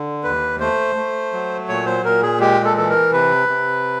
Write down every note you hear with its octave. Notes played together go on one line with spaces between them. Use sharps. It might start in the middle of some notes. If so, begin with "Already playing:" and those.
Already playing: D3
D#2 B4
A3 C5
A3
F#3
A#2 C#5
C5
A#2 A#4
G#4
G#3 G4
A4
E3 A4
A#4
C3 B4
C3